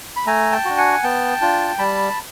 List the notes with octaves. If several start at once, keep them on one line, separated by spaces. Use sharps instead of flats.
B5
A3 G#5 A#5
G5 A5
D4 F#4
F#5 G#5
B3 G5 A5
D4 F4
G3 A5 B5